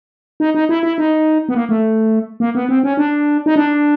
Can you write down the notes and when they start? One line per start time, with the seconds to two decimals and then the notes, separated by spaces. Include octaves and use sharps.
0.40 D#4
0.55 D#4
0.69 E4
0.83 E4
0.98 D#4
1.49 B3
1.55 A#3
1.69 A3
2.40 A#3
2.55 B3
2.69 C4
2.83 C#4
2.97 D4
3.46 D#4
3.56 D4